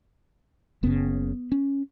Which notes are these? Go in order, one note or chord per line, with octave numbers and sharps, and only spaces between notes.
F#1 F#2 C#3 B3
C#4